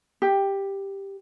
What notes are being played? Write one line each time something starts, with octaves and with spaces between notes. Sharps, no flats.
G4